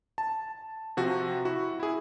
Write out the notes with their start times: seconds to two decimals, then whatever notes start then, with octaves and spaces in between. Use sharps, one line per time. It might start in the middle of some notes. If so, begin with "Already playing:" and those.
0.18 A5
0.97 C3 F3 F#4
1.45 E4 F#4
1.80 E4 G#4